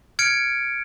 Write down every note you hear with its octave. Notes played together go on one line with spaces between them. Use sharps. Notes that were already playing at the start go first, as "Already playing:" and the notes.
F6 G#6 C#7 D7